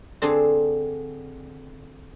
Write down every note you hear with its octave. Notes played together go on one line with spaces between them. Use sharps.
D3 C4 D4 G#4 A4